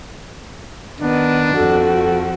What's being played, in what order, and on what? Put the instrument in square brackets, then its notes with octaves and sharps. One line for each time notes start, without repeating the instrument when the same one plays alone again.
[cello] D#3 [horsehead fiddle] B3 [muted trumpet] D4
[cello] F2 [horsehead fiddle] F#4 [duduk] A4